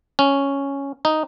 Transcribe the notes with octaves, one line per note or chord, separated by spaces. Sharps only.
C#4
D#4